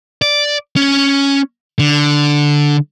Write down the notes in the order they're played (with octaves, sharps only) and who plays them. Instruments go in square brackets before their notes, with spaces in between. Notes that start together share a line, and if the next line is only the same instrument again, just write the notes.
[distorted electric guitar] D5
C#4
D3